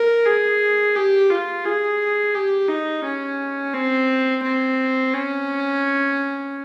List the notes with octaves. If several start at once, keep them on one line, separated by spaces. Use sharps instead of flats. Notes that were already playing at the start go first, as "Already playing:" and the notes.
Already playing: A#4
G#4
G4
F4
G#4
G4
D#4
C#4
C4
C4
C#4